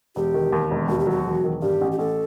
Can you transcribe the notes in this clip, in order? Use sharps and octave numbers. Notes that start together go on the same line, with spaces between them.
E1 G4
D#3
D#2
E1
D#2 F#4
G4
F#3 F#4
E1
D#3
G2 G4
A1
G4
A1 A4